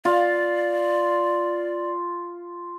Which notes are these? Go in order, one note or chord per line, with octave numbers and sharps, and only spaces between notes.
F4 D5